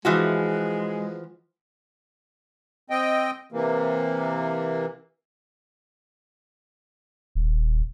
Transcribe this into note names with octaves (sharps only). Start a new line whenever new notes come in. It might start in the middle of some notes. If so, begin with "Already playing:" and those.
E3 F3 G#3 F#4
C4 D#5 G5
C3 E3 A#3
D#1